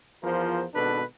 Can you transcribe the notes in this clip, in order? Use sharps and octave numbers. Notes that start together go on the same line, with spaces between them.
E2 F3 F4 A#4 C5
G#1 B2 D4 A4 B4